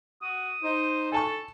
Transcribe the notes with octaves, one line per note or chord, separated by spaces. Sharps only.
F#4 D#6
D#4 C5
A4 G#5 A5 C#6